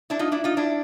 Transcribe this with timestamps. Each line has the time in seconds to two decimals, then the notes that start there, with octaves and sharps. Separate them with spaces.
0.10 D4 E4
0.19 D#4 F4
0.32 D4 E4
0.44 D#4 F4
0.57 D4 E4